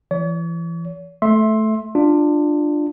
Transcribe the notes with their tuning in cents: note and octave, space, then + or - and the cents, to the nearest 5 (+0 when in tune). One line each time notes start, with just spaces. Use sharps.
E3 +30 C#5 +45
A3 -10 E5 +0 C6 +20
D4 +15 F4 +0